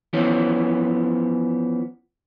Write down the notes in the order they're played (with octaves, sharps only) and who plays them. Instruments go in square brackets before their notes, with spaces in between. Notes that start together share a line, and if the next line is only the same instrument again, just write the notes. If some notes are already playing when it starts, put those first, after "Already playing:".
[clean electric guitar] E3 F3 B3 C#4